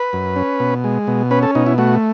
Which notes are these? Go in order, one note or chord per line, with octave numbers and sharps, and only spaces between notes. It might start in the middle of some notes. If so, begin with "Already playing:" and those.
Already playing: B4
F#2
C#4
B2
G#3
B2
C#4 B4
A4
B2 D#4
E4
A3 F#4